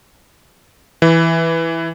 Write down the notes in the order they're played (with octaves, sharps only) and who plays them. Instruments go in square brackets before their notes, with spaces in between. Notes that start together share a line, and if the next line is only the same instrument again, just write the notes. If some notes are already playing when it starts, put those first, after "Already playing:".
[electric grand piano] E3